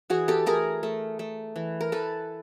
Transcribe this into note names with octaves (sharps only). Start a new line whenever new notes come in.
E3 F#4 G#4
G4 A4
A3 G#4 A#4
A3
A3
E3
A#4
E3 A4 B4